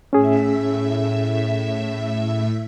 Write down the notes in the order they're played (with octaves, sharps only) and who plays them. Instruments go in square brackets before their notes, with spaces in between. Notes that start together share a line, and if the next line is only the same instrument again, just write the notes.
[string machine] A2 E5 [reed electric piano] C#4 G#4